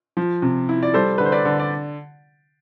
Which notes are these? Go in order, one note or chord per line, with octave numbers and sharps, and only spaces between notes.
F3
C3
E4
D5
G3 A4 C5
D3 B4
C5
B4 D5
D3
D5